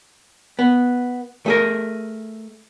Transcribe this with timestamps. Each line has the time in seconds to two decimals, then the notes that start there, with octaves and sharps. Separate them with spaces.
0.59 B3
1.46 A3 G#4 A#4